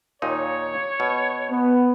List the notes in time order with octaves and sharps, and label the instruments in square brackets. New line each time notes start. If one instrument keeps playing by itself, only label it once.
[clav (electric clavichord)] D#2 A#2 D#4 [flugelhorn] C#5
[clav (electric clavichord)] B2
[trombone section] B3